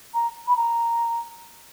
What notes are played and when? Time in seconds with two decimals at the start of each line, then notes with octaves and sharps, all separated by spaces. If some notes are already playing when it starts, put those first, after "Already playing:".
0.14 A#5
0.47 B5
0.56 A#5